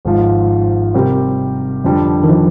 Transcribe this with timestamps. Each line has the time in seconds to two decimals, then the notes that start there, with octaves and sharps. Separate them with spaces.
0.05 G#1 G#2 F3
0.94 C3 G3 C4 G4 A#4
1.84 F2 D3 G3
2.23 D#3
2.30 F3